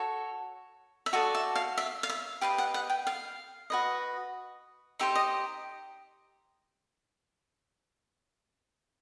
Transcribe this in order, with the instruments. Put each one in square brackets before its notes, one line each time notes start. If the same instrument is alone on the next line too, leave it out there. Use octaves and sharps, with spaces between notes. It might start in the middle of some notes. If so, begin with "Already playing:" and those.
Already playing: [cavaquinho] F#4 A4 C#5
E5
F#4 A4 D5 D#5
E5
F5
E5
F5
E5
G4 B4 D#5 F5
F#5
F#5
G5
F5
F#4 B4 D#5
D#4 G4 C5 E5
D#5